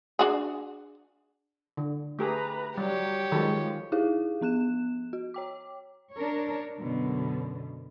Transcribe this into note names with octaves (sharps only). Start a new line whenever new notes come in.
D4 F#4 G#4
D3
A3 G4 G#4 B4 A#5
F#3 G3 G4 C#5
D#3 F3 F#3 G#3 A4
D#4 E4 G4 G#4 F5
F3 B3 F#6 E7
F#4
C#5 G5 D6
D4 A#4 C#5
F#2 B2 D3